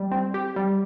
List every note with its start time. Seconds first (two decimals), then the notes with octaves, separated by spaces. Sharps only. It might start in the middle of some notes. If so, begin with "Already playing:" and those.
Already playing: G3
0.11 C4
0.34 G4
0.56 G3